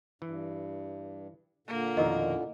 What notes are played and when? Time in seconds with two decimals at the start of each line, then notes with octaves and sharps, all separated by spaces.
0.22 G2 E3
1.68 A#2 D3 A#3
1.97 F2 B2 D#3 E4 A#4 D#5